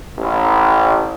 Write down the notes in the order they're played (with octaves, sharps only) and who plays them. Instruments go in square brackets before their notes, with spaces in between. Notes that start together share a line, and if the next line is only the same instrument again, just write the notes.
[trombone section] A1